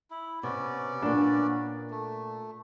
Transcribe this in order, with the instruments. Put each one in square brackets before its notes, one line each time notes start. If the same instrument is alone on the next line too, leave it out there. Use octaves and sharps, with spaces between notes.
[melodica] E4
[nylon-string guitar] C3 [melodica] B3 C#4 D5
[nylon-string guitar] A#2 A#3 [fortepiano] D4
[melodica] A3